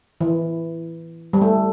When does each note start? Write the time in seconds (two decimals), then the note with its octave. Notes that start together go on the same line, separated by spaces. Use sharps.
0.21 E3
1.33 G3
1.42 A3